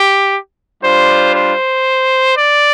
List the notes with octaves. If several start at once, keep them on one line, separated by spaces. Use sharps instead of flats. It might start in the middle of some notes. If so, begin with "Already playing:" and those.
Already playing: G4
G3 D4 F4 C5
C5
D5